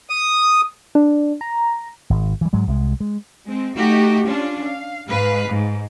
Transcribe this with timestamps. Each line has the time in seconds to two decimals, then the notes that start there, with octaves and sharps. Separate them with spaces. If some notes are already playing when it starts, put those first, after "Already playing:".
0.10 D#6
0.95 D4
1.41 A#5
2.10 G#1
2.41 E3 G3
2.53 G#2 F#3 G#3
2.67 C2 F#3 G#3
3.00 G#3
3.47 G#3 C4
3.76 A3 D#4 F#4 G4
4.26 C#4 D4 F4
4.66 F5
5.08 G#2 G#3 B4 F5
5.49 G#2